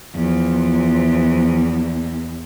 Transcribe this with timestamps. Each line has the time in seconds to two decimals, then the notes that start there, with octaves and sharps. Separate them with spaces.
0.14 E2 F3